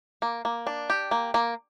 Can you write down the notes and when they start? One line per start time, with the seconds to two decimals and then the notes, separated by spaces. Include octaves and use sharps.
0.22 A#3
0.45 A#3
0.67 D4
0.90 G4
1.11 A#3
1.34 A#3